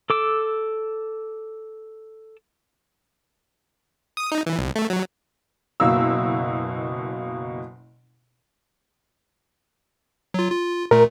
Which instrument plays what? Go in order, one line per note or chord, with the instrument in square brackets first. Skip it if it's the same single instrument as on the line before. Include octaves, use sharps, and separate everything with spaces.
[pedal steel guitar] A4 D6 E6
[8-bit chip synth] D#6
D#4
E3
C2
A3
F#3
[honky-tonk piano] F#1 B2 A#3 E6
[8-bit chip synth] F#3 F4
F4
[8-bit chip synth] A#2 A3 [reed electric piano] A#4